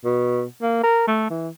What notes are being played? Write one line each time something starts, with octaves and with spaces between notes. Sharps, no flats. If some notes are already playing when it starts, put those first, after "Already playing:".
B2
A#3
A#4
A3
E3